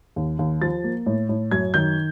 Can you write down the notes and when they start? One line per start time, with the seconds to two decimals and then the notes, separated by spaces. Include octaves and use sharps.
0.16 D#2
0.39 D#2
0.61 F3 A6
0.84 A#3
1.06 A2
1.29 A2
1.51 F#2 G#6
1.74 D#3 G6